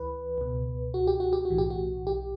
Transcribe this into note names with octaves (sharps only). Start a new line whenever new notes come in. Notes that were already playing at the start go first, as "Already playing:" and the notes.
Already playing: D2 E3 B4
C#2 B2
F#4
G4
F#4
G4
F#4
B1 A2 E3
G4
F#4
G4